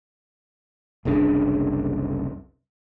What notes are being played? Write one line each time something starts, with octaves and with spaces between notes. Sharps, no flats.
F#1 C2 C#3 D4